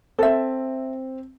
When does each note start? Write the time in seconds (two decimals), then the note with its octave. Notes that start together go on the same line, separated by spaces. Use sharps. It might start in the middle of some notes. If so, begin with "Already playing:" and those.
0.19 C4 A4 E5